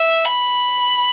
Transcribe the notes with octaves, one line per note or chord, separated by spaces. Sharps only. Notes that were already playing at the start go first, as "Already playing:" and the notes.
Already playing: E5
B5